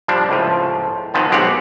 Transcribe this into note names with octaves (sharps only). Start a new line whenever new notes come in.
F3 G3 D4
C#2 A2 F3
D#3 F3 B3 C4
B1 G#3 C4 G4 C#5 F#5